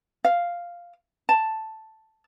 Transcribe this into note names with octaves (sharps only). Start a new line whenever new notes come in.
F5
A5